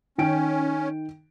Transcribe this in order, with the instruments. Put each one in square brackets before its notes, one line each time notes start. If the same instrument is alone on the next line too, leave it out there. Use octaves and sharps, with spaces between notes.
[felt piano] D#3 G5 D7 [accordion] C#4